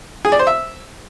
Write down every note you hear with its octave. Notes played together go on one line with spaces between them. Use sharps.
G#4
D5
C5
E5